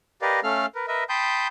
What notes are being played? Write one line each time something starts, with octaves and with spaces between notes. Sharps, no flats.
G4 A#4 B4 D5 D#5 F5
A3 C#4 A4 F5 F6
A#4 B4
A#4 B4 D#5 E5
G5 A5 B5 C6 D#6 G6